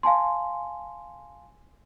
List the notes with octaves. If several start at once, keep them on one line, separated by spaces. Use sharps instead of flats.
F5 G#5 A5 C6